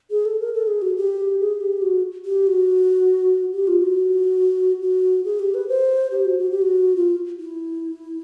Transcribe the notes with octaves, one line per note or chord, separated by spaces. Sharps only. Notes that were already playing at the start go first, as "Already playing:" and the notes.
G#4
A4
A#4
A4
G#4
F#4
G4
G#4
G4
F#4
G4
F#4
G4
F4
F#4
F#4
G#4
G4
B4
C5
G4
F#4
F#4
G4
F#4
F4
E4